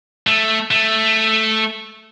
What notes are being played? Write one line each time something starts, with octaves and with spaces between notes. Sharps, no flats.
A3
A3